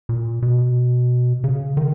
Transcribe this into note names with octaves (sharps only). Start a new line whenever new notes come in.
A#2
B2
C#3
D#3